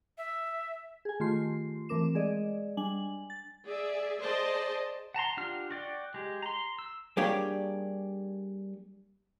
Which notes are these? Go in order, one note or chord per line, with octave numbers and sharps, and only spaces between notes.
E5
G#4 G#5
D#3 A3 F4 G4 C6 C7
E3 A3 C4 A#4 D6 E7
G#3 G#4 D5 D#5
G3 D4 G#5 F#7
A6
G#4 D5 E5
G#4 C5 D5 D#5 A5
F#5 A5 A#5 C6
D4 F4 G4 F#5 F6
F#4 D5 G5
G#3 G4
A#5 C6
E6
G3 A#3 D4 G4 G#4 C#5